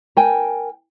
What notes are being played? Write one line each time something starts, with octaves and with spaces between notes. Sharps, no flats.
A#4 G5 G#5